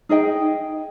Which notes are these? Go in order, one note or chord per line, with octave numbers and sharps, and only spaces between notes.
D#4 G#4 D#5 G5